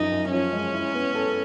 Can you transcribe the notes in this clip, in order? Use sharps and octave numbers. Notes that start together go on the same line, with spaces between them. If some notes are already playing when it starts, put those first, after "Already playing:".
Already playing: F#2 F3 D#4
F#2
F3 C#4
G#3
E4
B3
A4